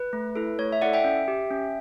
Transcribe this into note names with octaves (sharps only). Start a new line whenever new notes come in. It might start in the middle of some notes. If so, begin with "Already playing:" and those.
Already playing: B4
A3
E4 A4
A3 C#5
E5
E4 A4 D5 F#5
E5 G5
C#4
G4
C#4